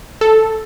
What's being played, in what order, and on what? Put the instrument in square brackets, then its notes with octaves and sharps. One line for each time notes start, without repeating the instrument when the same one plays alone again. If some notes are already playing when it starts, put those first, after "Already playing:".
[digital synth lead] A4